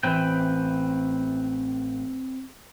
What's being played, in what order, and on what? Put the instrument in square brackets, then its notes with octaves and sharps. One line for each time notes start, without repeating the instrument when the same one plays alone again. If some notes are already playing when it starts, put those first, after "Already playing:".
[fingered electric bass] A1 E3 [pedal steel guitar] C4 B4 G5